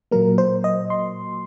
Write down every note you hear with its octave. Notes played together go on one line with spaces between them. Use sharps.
A#2 F#3 A#3 A#4
C5
D#5
C6